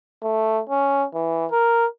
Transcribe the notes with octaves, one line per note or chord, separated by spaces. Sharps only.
A3
C#4
E3
A#4